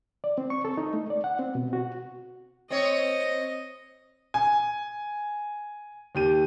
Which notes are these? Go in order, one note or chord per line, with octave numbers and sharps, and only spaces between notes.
D5
C4
C#6
A4
D#4
A3
D5
F#5
C4
B2
F#4
C4 C#5 D#5
G#5
D#2 G4 D#7